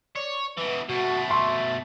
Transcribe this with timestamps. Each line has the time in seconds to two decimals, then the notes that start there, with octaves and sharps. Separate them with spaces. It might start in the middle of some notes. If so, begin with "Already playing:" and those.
0.16 C#5 D5
0.57 B2 E3 B4
0.89 B2 A3 F#4
1.30 E5 C6 C#6